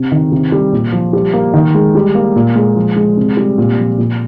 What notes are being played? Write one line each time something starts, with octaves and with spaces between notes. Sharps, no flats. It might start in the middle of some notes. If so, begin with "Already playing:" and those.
Already playing: C3
D#3
C3
G3
A#2
F3
G3
A#3
D#3
G#3
G3
A#3
A#2
G#3
F3
G#3
C3
G3
A#2
F3
A#2